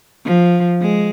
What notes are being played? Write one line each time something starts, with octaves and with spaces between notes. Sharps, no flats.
F3
G#3